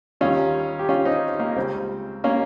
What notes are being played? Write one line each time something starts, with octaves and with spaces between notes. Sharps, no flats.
D#2 D#3 G3 C#4 F4
G4
C#4 F4
C4 D#4
A#3
C#2 C#3 G3 C4
A#3 C#4